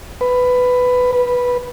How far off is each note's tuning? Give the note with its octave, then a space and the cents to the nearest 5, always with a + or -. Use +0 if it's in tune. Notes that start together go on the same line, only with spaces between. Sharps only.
B4 +10
B4 -10